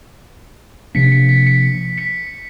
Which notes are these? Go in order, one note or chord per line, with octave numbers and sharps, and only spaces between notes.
C3 F3 A#3 D4 B6 C#7
B6 C#7
B6
B6 C#7
B6 C#7